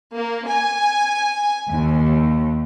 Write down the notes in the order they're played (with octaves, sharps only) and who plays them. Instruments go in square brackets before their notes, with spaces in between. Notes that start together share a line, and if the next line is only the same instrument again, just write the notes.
[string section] A#3
G#5
D#2